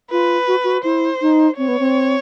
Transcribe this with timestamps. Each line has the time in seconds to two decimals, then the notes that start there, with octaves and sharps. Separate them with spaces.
0.11 F4 B4
0.47 F#4
0.64 F#4
0.84 E4 C5
1.22 D#4
1.58 C4 C#5
1.68 B3
1.79 C4